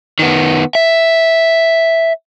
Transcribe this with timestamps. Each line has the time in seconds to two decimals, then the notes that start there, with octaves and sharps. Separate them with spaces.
0.19 D#3 B3
0.75 E5